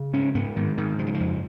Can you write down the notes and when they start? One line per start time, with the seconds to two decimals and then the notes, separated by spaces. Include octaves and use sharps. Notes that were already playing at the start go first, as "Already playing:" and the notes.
Already playing: C#3
0.13 G#2 C#4
0.35 G#2 B3
0.56 G#2 D#3
0.77 G#2 D#3
0.99 C#3 F3
1.07 F#3
1.14 F3
1.20 F2